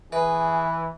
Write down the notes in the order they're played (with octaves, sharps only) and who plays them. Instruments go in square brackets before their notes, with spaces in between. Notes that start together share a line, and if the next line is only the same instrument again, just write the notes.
[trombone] E3 [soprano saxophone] G#4 [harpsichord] B4 [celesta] E5